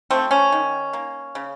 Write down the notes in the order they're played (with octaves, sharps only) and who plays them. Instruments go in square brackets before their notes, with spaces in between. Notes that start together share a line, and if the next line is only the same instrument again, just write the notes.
[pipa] F3 A3 C4
C#4
D#3
A#3
C#3